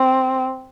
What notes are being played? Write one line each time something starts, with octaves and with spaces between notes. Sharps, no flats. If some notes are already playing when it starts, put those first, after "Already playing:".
Already playing: C4